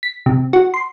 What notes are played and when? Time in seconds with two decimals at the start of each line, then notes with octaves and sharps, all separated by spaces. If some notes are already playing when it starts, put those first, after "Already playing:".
0.03 B6
0.26 C3
0.53 F#4
0.74 C6